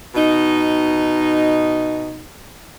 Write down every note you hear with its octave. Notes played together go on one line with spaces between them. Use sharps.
B2 D#4